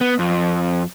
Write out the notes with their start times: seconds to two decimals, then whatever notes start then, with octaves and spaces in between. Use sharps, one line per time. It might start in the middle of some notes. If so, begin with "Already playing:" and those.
0.01 B3
0.19 F2